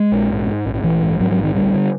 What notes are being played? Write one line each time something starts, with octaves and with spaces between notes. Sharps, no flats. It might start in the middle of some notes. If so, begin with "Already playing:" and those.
Already playing: G#3
A#1
G#2
G#2
A#1
A#1 E3
G#2
G#2 F#3
F#3
A#1
D#3
D2 G3
D3